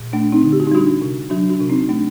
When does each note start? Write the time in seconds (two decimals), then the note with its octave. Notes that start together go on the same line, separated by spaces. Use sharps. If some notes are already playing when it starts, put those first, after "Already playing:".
Already playing: A#2
0.13 A3 D4
0.32 C4 D#4
0.43 D3
0.52 G4
0.60 F#4
0.67 D#4
0.72 G3 D4 F#4
1.01 C3
1.30 F#3 D4 F#4
1.49 D4 F#4
1.60 C3
1.69 C4 D#4
1.89 A3 D4